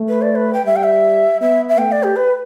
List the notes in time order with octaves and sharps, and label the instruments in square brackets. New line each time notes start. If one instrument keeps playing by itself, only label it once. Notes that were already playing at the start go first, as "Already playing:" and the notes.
Already playing: [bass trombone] A3
[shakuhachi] B4
D5
B4
G5
[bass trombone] G3 [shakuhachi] E5
[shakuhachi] G5
E5
[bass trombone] B3 [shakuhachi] E5
[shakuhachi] E5
[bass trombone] A3 [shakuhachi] G5
[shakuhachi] D5
G4
B4